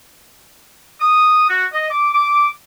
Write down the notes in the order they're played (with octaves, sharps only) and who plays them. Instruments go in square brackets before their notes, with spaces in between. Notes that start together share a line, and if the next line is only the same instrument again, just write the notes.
[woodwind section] D#6
F#4
D#5
D6
D6